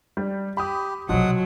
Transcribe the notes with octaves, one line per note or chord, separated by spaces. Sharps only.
G3
G4 B5 D#6
B1 C3 F3 F#3 G#3 F#5 D#6